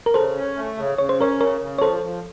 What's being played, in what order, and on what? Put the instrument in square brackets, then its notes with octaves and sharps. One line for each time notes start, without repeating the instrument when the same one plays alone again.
[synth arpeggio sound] A#4
[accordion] C#3 [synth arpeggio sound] A4 C5
[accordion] C#4
A3
C#3
[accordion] C#3 [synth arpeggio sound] C#5
[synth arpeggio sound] C5
[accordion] C#4 [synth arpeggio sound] A#4 C#5
[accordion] C#3 [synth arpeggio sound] A#4 C#5
[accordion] C#3
[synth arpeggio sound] C#5
[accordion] F3 [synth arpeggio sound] A4 C5
[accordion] F3